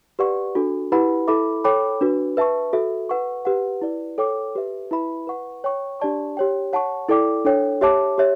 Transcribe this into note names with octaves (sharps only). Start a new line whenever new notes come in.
G4 B4 D5 F#5 C#6
D4 F#4 A4
E4 G4 B4 F#5 B5
E4 A4 E5 B5 D6
A4 C#5 G5 B5 D6
D4 F#4 B4
B4 E5 A5 C#6
F#4 A4 E5
B4 F#5 C#6
G4 B4 F#5
E4 B4 D5
A4 C#5 G5 D6
G4 B4 E5
E4 B4 E5 B5
B4 F#5 C#6
C#5 G5 C#6
D4 G4 D5 A5 C#6
G4 C#5 G5
C#5 F#5 A5 C#6
E4 A4 D5 G5 D6
D4 A4 C#5 G5
G4 C#5 E5 A5 D6
G4 C#5 E5